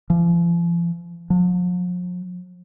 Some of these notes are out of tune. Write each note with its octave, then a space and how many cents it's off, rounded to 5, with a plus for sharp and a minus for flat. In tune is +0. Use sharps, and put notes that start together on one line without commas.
F3 -40
F3 +45